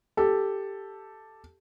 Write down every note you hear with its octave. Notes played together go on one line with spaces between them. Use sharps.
G4 A4